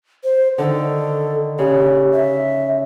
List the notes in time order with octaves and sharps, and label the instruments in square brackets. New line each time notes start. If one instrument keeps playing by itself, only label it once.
[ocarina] C5
[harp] D3 D#3 [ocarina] A4
[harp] C#3 [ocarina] G4
[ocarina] E5